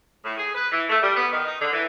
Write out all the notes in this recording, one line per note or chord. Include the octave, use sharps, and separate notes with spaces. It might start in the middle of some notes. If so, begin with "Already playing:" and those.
A2
G#4
B4
E3
A3
G3
B3
D#3
D#4
D3
E3